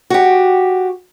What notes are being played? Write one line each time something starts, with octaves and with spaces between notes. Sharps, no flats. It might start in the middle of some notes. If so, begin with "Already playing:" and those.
F#4 G4